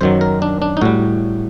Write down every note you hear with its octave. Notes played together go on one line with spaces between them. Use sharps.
F#2 D#3 F#3 C5
A#4
D4
D4
D#4
A2 G3 F#4